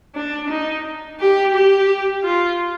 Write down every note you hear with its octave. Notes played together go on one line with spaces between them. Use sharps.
D4
D#4
G4
G4
F4